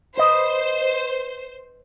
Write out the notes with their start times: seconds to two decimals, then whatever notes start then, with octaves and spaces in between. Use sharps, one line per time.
0.17 B4 C5 D#5